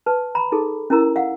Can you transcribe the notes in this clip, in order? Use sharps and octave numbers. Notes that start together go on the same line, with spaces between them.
B4 A5
A#5 B5
D#4 G#4 A4
C#4 E4 A#4 A#5 E6
F5 F#5